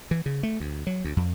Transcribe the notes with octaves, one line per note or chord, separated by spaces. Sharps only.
E3
C#3
A3
D2
F#3
D2
F2